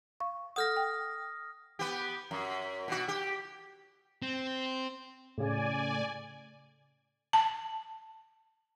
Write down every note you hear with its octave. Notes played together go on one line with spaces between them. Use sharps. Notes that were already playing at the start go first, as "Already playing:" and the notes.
F5 C#6
A4 F#5 D#6 F6 A#6
G5
B3 G4
F#2
B2 F#4
G4
C4
A2 C#3 D5 G#5
A5